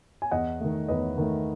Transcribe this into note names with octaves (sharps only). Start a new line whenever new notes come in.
G#5
E2 D#5 F#5
D#3 A3
E2 B4 D#5
D#3 A3